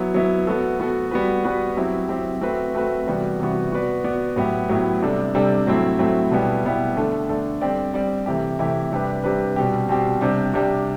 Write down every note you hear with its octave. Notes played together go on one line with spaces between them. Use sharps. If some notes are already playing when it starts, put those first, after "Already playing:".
Already playing: F#3 B3 E4
F#3 B3 E4
B3 F#4 A4
B3 F#4 A4
G3 B3 F#4 B4
G3 B3 F#4 B4
F#3 C4 E4 G4
F#3 C4 E4 G4
A3 C4 F#4 B4 E5
A3 C4 F#4 B4 E5
C3 E3 G3 B3 F#4
C3 E3 G3 B3 F#4
B3 F#4 B4 D5
B3 F#4 B4 D5
A2 F#3 B3 E4 G4
A2 F#3 B3 E4 G4
C3 G3 D4 A4
C3 G3 D4 A4
A2 F#3 A3 C4 E4
A2 F#3 A3 C4 E4
B2 G3 B3 E4 G4
B2 G3 B3 E4 G4
D3 A3 D4 A4
D3 A3 D4 A4
G3 C4 G4 D5
G3 C4 G4 D5
C3 E3 A3 E4 G4
C3 E3 A3 E4 G4
C3 G3 D4 G4 B4
C3 G3 D4 G4 B4
B2 G3 C4 G4
B2 G3 C4 G4
C3 G3 D4 G4
C3 G3 D4 G4